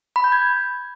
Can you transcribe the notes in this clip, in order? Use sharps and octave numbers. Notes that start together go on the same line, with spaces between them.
B5
G6
G#6